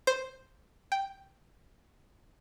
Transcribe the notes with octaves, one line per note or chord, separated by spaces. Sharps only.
C5
G5